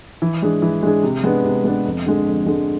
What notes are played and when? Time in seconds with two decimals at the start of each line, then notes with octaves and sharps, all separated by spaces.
0.22 E3
0.42 G#3 D4 G#4
0.62 E3
0.83 G#3 D4 G#4
1.03 C3
1.24 G#3 B3 D4
1.44 C3
1.64 G#3 B3 D4
1.85 F2
2.06 D3 G#3
2.26 F2
2.46 D3 G#3